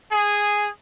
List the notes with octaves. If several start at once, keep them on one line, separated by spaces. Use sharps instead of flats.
G#4